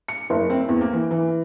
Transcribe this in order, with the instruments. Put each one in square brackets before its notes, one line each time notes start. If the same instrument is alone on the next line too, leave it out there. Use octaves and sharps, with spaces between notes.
[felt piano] C#7
F#1
C4
E2
A#3
E3
E3